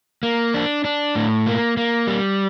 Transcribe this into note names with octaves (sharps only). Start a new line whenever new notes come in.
A#3
D4
D4
A2
A#3
A#3
G3